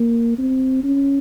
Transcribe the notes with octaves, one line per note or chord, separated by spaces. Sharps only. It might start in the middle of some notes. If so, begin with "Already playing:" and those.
Already playing: A#3
C4
C#4